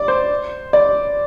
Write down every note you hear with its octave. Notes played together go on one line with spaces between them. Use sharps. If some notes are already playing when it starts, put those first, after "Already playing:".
Already playing: D5
C5
D5